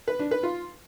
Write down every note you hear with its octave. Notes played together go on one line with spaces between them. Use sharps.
B4
D4
B4
F4